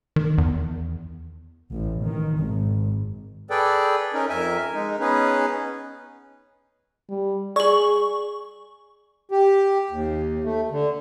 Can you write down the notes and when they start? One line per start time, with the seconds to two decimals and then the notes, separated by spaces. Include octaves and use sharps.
0.16 D#3
0.38 E2
1.73 A1
2.04 D#3
2.39 G#1
3.50 G#4 A4 B4 D5 G5
4.14 C#4 D#4 A#4
4.29 F2 A#4 E5 G#5
4.74 G#3 D#4
5.00 B3 C#4 D#4 G#4 B4
7.09 G3
7.56 G#4 D5 C#6 F#7
9.31 G4
9.91 D#2
10.44 A3
10.71 D3